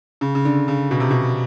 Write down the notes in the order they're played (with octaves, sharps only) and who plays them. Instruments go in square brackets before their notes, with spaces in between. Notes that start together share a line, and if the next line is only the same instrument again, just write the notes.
[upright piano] C#3
C#3
D3
C#3
B2
C3
B2